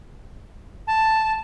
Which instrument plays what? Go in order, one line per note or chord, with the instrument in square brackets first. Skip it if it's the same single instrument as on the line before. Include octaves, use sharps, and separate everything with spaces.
[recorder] A5